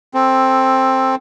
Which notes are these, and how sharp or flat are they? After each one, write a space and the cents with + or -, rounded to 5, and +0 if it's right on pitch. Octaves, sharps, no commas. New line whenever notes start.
C4 +10 A4 +0